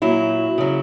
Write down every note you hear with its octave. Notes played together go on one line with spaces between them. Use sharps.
A#2 F#3 E4
C#3 F#3